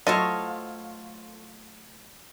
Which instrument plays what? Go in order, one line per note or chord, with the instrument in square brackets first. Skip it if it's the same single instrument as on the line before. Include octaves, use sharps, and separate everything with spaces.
[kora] F#3 A3 E4 [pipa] F4 [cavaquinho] A4 C5 C#5 [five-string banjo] D#5